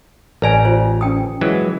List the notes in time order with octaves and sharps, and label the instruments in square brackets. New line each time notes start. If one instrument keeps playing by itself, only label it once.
[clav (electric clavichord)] A1 A#5 [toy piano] B4 D5 G#5
[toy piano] F4 C5
C#4 G5 D#6
[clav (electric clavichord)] E3 F#3 G#3